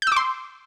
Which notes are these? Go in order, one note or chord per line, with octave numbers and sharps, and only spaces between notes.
C6 D6 E6 G6